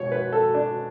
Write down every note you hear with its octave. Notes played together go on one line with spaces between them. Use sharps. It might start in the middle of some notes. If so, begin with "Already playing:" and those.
Already playing: B2 G#3 C#5
B4
A4
D4